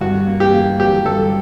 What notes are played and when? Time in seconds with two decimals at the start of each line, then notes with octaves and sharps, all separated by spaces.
0.01 G2 F#4
0.27 A#3
0.40 G4
0.53 A#3
0.80 F#3 G4
1.05 G2 A4